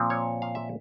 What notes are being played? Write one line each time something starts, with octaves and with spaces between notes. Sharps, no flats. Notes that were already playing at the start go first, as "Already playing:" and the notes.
Already playing: A#2 F3 C4
C#5
F5
E5